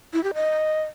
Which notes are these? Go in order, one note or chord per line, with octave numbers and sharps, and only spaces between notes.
E4
G4
D#5